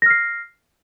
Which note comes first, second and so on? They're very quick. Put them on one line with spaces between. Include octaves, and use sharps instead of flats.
A#6 F6 C7